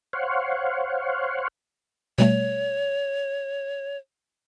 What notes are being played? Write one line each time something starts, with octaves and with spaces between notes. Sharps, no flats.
C5 C#5 F5 F#5
B2 G3 A3 C#5